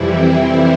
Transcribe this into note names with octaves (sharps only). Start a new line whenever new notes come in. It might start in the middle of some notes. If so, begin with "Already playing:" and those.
Already playing: F2 C3 E3 G3 E4
C4